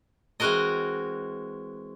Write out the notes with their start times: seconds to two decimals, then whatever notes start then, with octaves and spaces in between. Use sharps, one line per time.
0.40 E3 G#3 C4 F#4 A#4 D#5